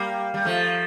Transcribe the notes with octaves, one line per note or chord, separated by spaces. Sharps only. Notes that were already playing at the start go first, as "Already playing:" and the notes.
Already playing: G3 A#3
G3
F3 A3